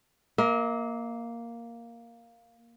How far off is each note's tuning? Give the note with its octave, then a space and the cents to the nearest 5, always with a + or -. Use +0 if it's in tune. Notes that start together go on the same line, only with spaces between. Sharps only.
A#3 +0 E5 -45